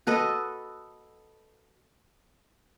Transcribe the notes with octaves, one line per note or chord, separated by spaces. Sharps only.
F#4 A4 B4 D#5